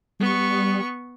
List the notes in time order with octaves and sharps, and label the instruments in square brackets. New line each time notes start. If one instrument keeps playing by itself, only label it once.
[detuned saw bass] G3 [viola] B3 C#6